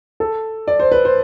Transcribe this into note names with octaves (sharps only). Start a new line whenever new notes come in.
A4
D5
C5
B4
C5